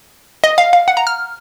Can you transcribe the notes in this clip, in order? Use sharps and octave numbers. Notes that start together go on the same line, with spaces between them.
D#5
F5
F5
F#5
A#5
F6